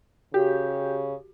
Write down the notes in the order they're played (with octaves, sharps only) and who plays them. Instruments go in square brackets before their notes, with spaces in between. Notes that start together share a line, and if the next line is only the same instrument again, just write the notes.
[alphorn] C#3 [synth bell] F#4 [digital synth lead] G4